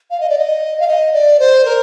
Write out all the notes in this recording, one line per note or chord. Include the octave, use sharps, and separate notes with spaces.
F5
D#5
D5
D#5
F5
D#5
D5
C5
A#4